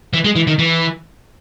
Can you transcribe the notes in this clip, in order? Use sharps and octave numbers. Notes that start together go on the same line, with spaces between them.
E3
G#3
E3
D#3
E3